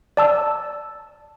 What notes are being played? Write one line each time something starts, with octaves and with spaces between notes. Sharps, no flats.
D5 A5 E6